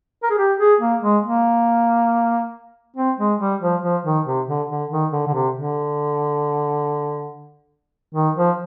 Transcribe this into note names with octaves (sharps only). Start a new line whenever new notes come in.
A#4
G#4
G4
G#4
A#3
G#3
A#3
C4
G#3
G3
F3
F3
D#3
C3
D3
D3
D#3
D3
D3
C3
D3
D#3
F3